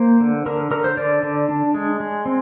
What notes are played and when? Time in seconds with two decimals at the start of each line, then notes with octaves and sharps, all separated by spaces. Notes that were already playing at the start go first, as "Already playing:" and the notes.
Already playing: A#3 C5
0.20 D3
0.46 D3 A#4
0.71 D3 A#4
0.84 C5
0.97 D3 D5
1.23 D3
1.49 D4
1.74 G#3
2.00 G#3
2.26 C4